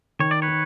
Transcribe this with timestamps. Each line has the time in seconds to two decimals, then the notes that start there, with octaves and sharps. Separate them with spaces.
0.19 D#3 C#5
0.31 D5
0.42 B4 C#5
0.48 D#3